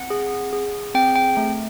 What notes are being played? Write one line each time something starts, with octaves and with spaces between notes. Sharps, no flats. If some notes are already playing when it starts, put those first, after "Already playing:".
Already playing: C4 F#5
G#4
G#4
C4 G5
G5
A3